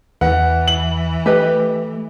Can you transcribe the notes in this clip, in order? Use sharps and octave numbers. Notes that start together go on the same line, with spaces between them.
E2 E3 B4 F#5
F#7
A3 G4 B4 D#5